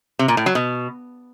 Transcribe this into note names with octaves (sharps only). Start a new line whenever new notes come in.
C3
A#2
A2
F#3
B2